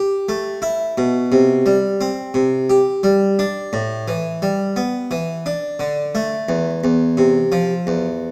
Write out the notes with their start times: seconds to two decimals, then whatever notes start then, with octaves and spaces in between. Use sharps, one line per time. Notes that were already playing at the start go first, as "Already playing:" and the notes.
Already playing: G4
0.29 A3
0.62 E4
0.98 B2
1.32 C3
1.66 G3
2.01 C4
2.34 C3
2.70 G4
3.03 G3
3.39 D4
3.73 A2
4.08 E3
4.42 G3
4.76 B3
5.11 E3
5.46 D4
5.80 D3
6.15 A3
6.49 E2
6.84 E2
7.17 C3
7.52 F3
7.87 E2